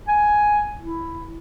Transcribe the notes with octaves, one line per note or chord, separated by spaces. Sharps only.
G#5
E4